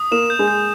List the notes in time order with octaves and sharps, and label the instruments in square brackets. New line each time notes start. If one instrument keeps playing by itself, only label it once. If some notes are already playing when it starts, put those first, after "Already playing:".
Already playing: [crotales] D#6
[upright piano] A#3 [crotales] E7
[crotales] G6
[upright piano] G#3
[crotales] G6